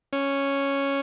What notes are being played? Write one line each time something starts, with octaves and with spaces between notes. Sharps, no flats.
C#4